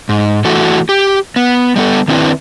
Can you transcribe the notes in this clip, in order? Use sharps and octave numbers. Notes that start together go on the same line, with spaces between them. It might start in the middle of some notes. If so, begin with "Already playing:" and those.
G#2
E3 A3 F#4 A4
G4
B3
G3 B3 A4
D#3 C4 D4 E4 B4